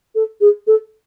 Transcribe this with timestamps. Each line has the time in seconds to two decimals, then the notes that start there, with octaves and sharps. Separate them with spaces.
0.15 A4
0.41 G#4
0.67 A4